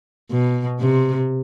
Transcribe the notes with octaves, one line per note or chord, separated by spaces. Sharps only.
B2
C3